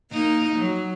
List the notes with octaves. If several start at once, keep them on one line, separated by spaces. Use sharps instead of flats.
A#3 D#4
F#3